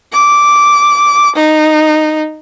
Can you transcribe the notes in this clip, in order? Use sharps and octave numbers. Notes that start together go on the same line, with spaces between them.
D6
D#4